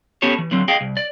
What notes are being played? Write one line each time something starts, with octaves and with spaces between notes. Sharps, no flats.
B3 C#4 G4 A4 C#5
E3
D3 F#3 C4
G#4 D#5 F5 G5
C2
D5